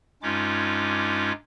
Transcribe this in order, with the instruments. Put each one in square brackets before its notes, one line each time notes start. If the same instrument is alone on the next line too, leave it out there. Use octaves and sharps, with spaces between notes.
[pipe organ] G2 G#3 C#4 D#4 F4 D6